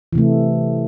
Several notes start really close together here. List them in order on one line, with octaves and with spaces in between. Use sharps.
E3 C3 A3